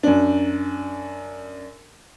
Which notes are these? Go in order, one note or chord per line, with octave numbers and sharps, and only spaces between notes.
F#2 D4